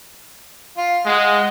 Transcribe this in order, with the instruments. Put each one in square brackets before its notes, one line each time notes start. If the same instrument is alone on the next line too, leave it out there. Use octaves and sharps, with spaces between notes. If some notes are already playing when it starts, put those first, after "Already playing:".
[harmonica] F4
[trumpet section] G#3 [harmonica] D#5 F#5